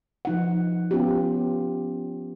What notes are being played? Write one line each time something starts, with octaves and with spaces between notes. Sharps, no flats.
F3 D#4 F#5
B3 C#4 F4 G4